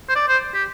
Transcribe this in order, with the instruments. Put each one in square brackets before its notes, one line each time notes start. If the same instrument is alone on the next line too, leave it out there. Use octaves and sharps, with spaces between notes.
[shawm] C5
D5
C5
G4